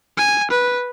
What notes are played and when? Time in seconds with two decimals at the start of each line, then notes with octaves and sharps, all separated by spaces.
0.17 G#5
0.51 B4